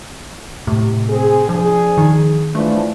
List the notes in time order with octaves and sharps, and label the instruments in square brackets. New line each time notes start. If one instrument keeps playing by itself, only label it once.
[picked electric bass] A2 [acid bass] C3
[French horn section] C4 G#4
[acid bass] F3 [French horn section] D4 G#4
[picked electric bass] D#3
[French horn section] E3 F3 D4 [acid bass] A3